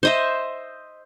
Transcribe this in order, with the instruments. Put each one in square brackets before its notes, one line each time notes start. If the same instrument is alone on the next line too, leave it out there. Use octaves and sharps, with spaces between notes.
[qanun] C5 D#5 E5